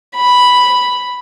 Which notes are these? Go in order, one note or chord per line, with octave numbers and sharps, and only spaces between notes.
B5